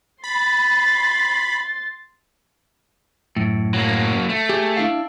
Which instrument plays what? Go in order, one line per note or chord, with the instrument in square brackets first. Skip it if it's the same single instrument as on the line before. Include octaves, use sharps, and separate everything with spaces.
[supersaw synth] B5 [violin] C6 A6
[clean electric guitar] F#2 A2
[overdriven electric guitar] F#3 A#3
A3
[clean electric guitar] G4 G#4
D4 E4 F5